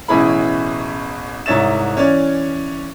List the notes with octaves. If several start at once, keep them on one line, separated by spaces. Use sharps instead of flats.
A1 B2 C#4 E4 G#4 B5
C2 G#2 C#5 E5 A6 E7
E3 C#4 C#5 D5